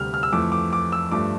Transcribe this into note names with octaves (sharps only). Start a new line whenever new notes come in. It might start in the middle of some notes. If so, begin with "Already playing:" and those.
Already playing: D2 C3 G3 F6
F6
E6
F2 E3 A3 D6
D6
D6
E6
G2 F3 A3 D6